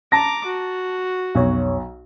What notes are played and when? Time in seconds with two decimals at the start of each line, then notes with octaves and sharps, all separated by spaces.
0.12 A5 A#5 D6 A#6
0.46 F#4
1.35 B1 F2 B2 C#5